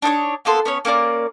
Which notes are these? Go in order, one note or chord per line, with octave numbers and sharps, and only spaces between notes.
D4 D#4 C5 C#5
A#3 B3 A4 C6
B3 C#4 C#5
A#3 C#4 A#4 D5